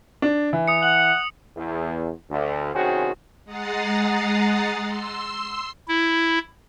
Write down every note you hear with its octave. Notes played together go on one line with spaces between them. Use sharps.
D4
E3
D#6 C#7
F#5 F#7
E2
D2
C2 D#3 C#4 F#4 G#4 C5
G#3 F#5 A#5 D#6 A6 C7
C6 E6 C7
E4